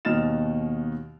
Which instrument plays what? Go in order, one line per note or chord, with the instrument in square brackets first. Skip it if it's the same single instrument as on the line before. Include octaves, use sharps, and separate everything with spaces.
[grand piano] D#2 B2 D#4 F6 A6 E7